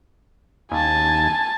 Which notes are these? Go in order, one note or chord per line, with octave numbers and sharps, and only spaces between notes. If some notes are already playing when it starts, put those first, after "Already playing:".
D#2 G#5 A5